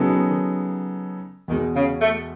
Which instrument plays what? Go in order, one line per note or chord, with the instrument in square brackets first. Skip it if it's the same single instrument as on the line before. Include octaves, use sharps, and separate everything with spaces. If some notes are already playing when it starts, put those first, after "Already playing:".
Already playing: [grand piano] C#3 F#3 B3 D#4 A4
[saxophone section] B2
D#3
[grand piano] E2 B2 G#3 [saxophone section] D#3
[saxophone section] C#3
A3